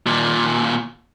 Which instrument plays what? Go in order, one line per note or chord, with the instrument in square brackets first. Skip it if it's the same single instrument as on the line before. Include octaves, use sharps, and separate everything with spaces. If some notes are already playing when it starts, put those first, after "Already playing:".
[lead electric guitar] D#2 A#2